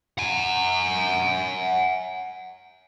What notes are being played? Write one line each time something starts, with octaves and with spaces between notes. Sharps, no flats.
F#5 G#5